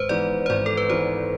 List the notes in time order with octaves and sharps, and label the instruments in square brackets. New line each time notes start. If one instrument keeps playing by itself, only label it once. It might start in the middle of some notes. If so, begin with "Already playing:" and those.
Already playing: [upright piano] G#1 [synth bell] B4 C5
[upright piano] G#2 E3 B3 [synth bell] D5
[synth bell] C5
[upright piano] G#1 [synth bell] D5
[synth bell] A4
B4
[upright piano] G#2 E3 B3 [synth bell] C5